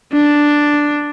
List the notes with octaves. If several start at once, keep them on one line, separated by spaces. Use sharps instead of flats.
D4